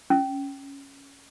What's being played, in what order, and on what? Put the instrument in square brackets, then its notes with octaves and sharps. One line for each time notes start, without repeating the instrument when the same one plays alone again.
[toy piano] C#4